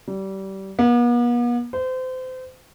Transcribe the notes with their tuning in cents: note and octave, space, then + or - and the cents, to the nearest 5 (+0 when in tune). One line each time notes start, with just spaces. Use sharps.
G3 -25
B3 -45
C5 -30